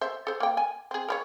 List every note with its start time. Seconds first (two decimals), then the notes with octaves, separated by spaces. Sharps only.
0.01 C5 E5
0.27 A4 C5
0.40 A#3 G5
0.57 G#5
0.91 C4 G#4
1.08 A#4 B4 C#5